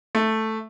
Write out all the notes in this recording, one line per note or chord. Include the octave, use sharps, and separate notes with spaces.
A3